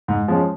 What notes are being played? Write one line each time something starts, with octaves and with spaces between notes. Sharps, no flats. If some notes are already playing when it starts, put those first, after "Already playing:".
G#2
F3 G#3 C#4